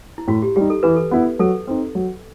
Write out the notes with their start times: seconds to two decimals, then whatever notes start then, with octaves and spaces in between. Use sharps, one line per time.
0.18 E4
0.28 A2 F#4
0.42 G4
0.56 G3 D#4 G4
0.70 A4
0.83 E3 B4
0.96 A4
1.11 B3 E4
1.39 F#3 A4
1.67 C4 D#4
1.95 F#3